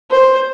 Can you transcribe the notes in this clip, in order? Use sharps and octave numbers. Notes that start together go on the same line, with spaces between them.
C5